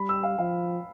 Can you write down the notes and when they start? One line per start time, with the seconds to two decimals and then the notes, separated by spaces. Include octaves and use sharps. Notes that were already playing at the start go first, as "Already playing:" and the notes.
Already playing: G3 B5
0.09 E6
0.23 F5
0.38 F3 F5